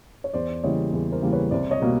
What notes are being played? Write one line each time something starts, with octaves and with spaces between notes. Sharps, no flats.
C#5
E2 C5 D5
C#3 E3 G3 A#3 C#5 D#5
E2
A#4 C5
C#3 E3 G3 A#3
B4 C#5
C2 C5 D5
C#5 D#5
B2 G3 A#3